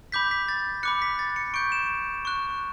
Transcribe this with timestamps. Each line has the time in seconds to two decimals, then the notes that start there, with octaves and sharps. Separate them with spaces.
0.12 B5 D6 G6 B6
0.31 B6
0.49 A6
0.83 B5 D6 F#6 C#7
1.02 B6
1.19 A6
1.36 C#7
1.54 C#6 G6 D7
1.72 E7
2.25 C#6 F#6